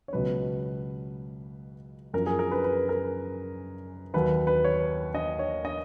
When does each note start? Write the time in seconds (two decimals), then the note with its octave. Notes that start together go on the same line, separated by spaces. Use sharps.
0.08 C#5
0.13 C#2 B2 F#3 B4
2.13 F#2 F3 A#4
2.26 G#4
2.39 A#4
2.51 B4
2.64 B4
2.89 A#4
4.14 D#2 D#3 F#3 B4
4.47 B4
4.64 C#5
5.15 D#5
5.39 C#5
5.65 D#5